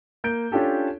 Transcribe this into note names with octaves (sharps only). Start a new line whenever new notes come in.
A#3 G6 D7
C#4 D4 F4 G4 A4